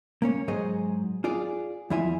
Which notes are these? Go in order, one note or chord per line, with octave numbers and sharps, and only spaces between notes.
A#3 C#4 C#5
G#2 F#3 G#4 C5 D#5
F4 G#4 D5
E2 F3 E4 F4 E5 G#5